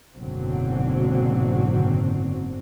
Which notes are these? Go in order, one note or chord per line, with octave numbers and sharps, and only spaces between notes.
F#1 G#2 B2 D3 F#3 C4